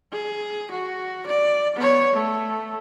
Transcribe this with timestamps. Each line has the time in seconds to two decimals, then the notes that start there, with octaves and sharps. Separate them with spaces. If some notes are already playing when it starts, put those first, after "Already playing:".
0.13 G#4
0.71 F#4
1.27 D5
1.76 B3 C#5
2.13 A3